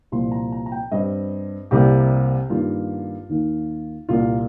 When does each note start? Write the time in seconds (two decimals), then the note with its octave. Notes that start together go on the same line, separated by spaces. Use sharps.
0.12 C2 A#2 F3 C4 C6
0.32 A#5
0.52 A#5
0.66 A#5
0.72 G5
0.91 G2 G3 C4 D#5
1.71 C2 C3 G3 A#3 G4
2.50 G2 D#3 A#3 F4
3.29 D#2 D#3 A#3
4.09 C2 A#2 A#3 F4